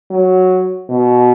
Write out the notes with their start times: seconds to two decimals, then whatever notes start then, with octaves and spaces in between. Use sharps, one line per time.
0.11 F#3
0.89 B2